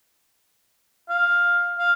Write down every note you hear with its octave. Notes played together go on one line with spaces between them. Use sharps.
F5
F5